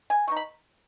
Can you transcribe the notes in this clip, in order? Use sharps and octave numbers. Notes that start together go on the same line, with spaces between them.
G#5
B2 B3 D#4 C#6
B5